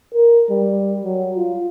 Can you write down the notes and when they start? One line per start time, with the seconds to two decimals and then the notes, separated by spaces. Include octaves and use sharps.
0.14 A#4
0.51 G3
1.04 F#3
1.36 F4